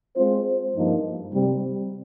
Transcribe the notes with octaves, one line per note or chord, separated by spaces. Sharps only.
G#3 C4 F4 C5
G2 F3 A#3 D#4
C3 G3 C4